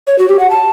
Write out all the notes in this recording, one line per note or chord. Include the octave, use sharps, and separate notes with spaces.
C#5
F#4
G4
F#5
A5